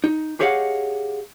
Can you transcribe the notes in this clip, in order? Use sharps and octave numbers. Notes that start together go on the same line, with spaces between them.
D#4
G4 G#4 C#5 D#5 F5 F#5